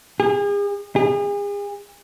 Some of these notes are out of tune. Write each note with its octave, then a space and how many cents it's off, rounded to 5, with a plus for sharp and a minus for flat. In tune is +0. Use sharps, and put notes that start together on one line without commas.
G#4 -40
G#4 -40